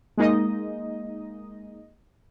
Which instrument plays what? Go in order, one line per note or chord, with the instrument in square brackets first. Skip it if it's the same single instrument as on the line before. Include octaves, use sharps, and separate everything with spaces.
[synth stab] G#3 A#3 D#4 D#5